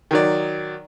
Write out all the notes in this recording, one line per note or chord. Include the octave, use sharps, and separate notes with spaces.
D#3 F#3 D5